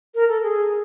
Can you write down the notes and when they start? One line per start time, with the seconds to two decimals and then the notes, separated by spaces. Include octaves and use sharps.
0.15 A#4
0.29 A4
0.43 G#4